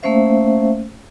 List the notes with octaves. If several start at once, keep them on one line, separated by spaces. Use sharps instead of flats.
A3 A#3 C#4 C5 E5 F5